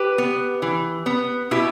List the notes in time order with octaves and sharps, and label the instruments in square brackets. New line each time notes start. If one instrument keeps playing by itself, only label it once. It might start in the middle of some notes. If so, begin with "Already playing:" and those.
Already playing: [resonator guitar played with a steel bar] G4 B4
B3
E3
B3
B2 E4 G4